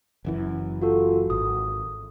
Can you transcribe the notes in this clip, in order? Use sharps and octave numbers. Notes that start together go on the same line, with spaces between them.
F#1 F#2 E3
F4 F#4 A4
G#1 D#6